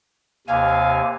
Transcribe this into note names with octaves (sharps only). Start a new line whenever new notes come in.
D#2 C3 F5 G#5